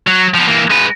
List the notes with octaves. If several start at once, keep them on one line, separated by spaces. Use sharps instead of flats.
F#3
F3 B3
E3 A#3
G#3 B4